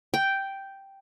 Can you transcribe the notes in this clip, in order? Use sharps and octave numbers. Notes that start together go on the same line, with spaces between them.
G5